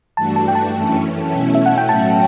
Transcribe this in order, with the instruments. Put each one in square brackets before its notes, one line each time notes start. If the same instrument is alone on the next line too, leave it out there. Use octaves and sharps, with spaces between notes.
[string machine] G2 E3 A3 D4 F#4 [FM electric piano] A5
[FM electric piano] A5
G5
A5
[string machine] F#2 E3 A3 C#4
B2 A3 C#4 E4
[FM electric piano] E5
F#5
G5
[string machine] A2 F#3 C#4 F#4 [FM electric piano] A5